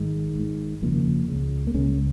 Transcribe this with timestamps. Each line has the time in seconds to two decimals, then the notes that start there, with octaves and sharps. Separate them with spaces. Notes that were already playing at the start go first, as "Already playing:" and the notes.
Already playing: G#1 G#2 D#3 G#3
0.36 G#1 G#2
0.82 F1 D#2 C#3 F3 A#3
1.28 C#2 C#3
1.67 A#3
1.74 C#2 C#3 G#3 C#4
1.88 G#3